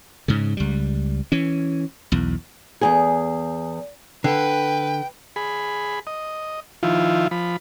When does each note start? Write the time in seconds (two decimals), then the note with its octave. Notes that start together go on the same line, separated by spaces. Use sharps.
0.28 G#2 C#3
0.57 C#2 G3
1.32 E3 C#4
2.12 B1 E2
2.81 E2 G#2 G#4
4.24 D3 B4 G5
5.36 G#4 B5
6.07 D#5
6.83 D#3 F3 E4 F4
7.31 F3 B5